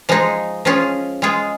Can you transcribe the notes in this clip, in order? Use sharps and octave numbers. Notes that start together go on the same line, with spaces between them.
F3 G#3 D#4 G#4
F3 C#4 F4 G#4
G#3 F4 G#4